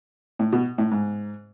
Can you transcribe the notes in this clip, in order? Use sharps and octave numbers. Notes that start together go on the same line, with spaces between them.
A2
B2
A2
G#2